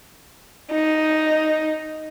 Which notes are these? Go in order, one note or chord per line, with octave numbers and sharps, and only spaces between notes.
D#4